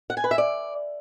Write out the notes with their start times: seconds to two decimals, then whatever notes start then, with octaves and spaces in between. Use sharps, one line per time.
0.10 F#5
0.17 G#5
0.24 B4
0.31 E5
0.38 D5